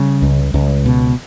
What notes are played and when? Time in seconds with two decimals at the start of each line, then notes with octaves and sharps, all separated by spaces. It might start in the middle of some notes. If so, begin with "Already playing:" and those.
Already playing: C#3 G3
0.22 C#2
0.54 C#2
0.86 B2